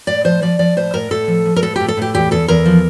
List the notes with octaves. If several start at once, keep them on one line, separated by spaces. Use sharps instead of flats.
A2 D5
F3 C5
F3 D5
F3 D5
A2 C5
A2 A#4
A2 A4
F3
F3
A#4
A2 A4
A2 G4
A4
A2 G4
E2 G4
E2 A4
E2 A#4
F3